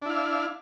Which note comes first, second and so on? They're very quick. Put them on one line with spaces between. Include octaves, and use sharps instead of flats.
D4 E4 F5